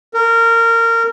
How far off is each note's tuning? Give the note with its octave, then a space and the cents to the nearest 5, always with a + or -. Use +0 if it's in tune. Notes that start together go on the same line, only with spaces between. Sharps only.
A#4 -20